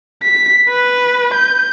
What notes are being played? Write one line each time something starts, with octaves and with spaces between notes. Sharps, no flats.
B6
B4
G6